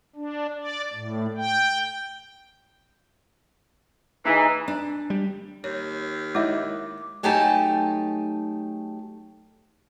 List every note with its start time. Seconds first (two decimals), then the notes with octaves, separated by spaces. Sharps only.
0.16 D4
0.57 D5
0.93 A2
1.37 G5
4.25 E3 D#4 G#4 D#5
4.68 D4
5.10 G3
5.64 D#2 C#5
6.35 G#3 D#4 E4 C#5 D6
7.23 F#3 A3 D#4 G4 G#5 A5